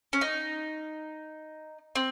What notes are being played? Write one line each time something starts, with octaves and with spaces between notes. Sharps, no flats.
C#4
D#4
C4